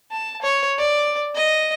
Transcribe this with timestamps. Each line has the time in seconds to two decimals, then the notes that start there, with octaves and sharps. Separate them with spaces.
0.11 A5
0.42 C#5
0.78 D5
1.35 D#5